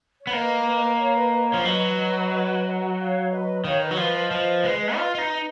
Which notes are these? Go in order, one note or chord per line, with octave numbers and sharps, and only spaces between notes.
C#5
B3
A#3 B4 D#5
C#5 F5
B4 D#5
B4 D#5
C#5 F5
F3
F#3 B4 D#5
C#5 F5
B4 D#5
D#3 C#5 F5
B4 D#5
F#3
F3 B4 D#5
B4 D#5
F3
G#3
F4
F4
D#4